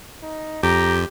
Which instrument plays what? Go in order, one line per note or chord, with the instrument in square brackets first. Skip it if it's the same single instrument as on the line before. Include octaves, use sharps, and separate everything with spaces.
[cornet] D#4
[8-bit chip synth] F2 [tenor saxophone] G4 [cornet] A#5